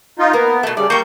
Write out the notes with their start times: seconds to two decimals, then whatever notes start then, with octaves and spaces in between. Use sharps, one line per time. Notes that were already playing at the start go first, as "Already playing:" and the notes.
0.19 D#4 F4
0.33 A#3 B3 A#4
0.63 B2 A3
0.77 C#3 G3 D5
0.90 G3 A#3 C#6 G6